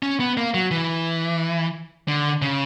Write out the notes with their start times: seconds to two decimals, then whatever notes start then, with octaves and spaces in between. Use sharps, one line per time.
0.03 C#4
0.20 B3
0.37 A#3
0.54 F#3
0.71 E3
2.08 D3
2.42 C#3